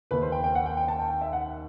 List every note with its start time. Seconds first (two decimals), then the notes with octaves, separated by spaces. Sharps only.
0.11 D#2 D#3 B4
0.22 C5
0.32 G5
0.44 G5
0.55 F#5
0.66 G5
0.77 G5
0.88 A5
0.99 G5
1.10 G5
1.21 E5
1.33 F#5